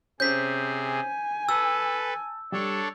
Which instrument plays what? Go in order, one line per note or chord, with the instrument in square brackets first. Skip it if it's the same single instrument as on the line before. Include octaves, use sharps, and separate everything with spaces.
[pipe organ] C3 G#4 [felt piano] C#4 C5 [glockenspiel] G6 B6
[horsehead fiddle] G#5
[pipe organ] A4 B4 [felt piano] A5 [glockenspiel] E6
[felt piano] G3 [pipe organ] D4 A4 C#5